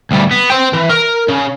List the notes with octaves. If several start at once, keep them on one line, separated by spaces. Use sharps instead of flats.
D2 G3
B3
C5 G5
E3
A#4
C#3